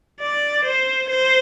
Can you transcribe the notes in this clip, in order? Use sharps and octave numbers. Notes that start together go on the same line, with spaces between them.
D5
C5
C5